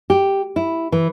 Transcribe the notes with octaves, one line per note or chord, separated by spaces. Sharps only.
G4
E4
E3